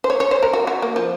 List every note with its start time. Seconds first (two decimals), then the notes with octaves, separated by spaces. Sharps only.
0.04 C5
0.10 C#5
0.20 C#5
0.31 C5
0.43 A#4
0.53 F#4
0.67 F#4
0.82 A#3
0.96 F3